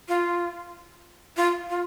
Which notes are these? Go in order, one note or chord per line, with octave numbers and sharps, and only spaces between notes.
F4
F4
F4